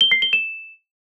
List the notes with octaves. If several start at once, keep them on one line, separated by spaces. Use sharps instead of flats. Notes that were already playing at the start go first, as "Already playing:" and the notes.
G7
C7
G7
E7